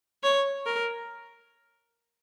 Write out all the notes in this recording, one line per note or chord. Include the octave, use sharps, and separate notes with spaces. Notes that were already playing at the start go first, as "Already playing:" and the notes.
C#5
A#4